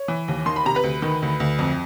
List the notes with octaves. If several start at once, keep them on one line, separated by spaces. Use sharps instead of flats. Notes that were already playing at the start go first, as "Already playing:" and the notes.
Already playing: C#5
E3
D#2
D#3 C6
B5
C3 A#5
B4 B5
D2
D#3
D2
D2
F2